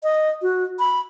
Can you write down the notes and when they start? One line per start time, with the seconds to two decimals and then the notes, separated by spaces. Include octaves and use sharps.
0.03 D#5
0.42 F#4
0.79 B5